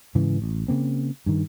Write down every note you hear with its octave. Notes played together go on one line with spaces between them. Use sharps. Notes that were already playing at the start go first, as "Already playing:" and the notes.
G#2 C#3 E3
A1
C#3 A#3 C4
G2 D#3